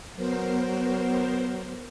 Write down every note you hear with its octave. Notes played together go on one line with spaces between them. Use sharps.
F#3 B3 A#4 C5